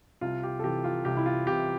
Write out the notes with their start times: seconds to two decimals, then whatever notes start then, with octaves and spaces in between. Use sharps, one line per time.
0.21 C2 F4
0.43 G4
0.59 A4
0.64 C3 E3 G4
0.84 F4
1.05 C2 G4
1.17 E4
1.26 F4
1.47 C3 E3 G4